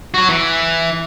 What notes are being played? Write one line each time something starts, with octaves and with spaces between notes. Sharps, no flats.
F#4 C#5
E3